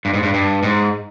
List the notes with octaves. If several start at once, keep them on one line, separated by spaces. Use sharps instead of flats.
G2
G#2
G2
G2
G#2